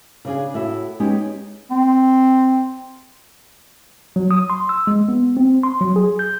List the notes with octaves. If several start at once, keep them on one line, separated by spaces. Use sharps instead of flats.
C#3 D4 G#4
A2 F#4 E5
G#3 B3 C#4 D#4 G4
C4
F#3
D#6
C6
E6
G#3
B3
C4
C6
F#3
G#4
G6